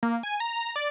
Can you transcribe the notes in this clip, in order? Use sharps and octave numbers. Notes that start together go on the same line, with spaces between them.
A#3
G#5
A#5
D5